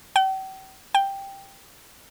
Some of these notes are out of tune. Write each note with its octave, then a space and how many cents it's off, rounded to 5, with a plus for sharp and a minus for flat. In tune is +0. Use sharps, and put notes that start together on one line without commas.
G5 -40
G5 +5